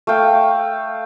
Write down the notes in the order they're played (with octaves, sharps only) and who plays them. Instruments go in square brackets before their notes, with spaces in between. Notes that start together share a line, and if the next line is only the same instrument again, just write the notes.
[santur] A3 F5 G5